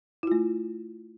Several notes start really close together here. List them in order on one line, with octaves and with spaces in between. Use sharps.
E4 F4 A3